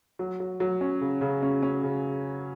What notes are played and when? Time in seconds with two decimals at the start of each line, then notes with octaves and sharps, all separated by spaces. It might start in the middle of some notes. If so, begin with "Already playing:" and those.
0.19 F#3
0.40 F#3
0.60 F#3
0.81 C#4
1.01 C#3
1.21 C#3
1.42 C#4
1.62 C#4
1.83 C#3